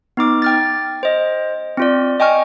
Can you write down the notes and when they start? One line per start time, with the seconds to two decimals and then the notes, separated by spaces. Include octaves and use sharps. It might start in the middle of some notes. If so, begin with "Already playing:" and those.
0.17 B3 D#4 D6
0.42 G5 F6 A6
1.03 C5 D#5
1.77 C4 F4 D5
2.20 D#5 G5 G#5 C#6 F6